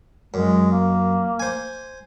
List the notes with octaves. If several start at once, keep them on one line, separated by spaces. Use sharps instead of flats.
F#2 G#3
A#3
C5 G#5